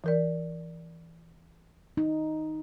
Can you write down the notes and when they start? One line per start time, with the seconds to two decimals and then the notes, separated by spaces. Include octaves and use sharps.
0.04 E3 A#4 D5
1.97 D#4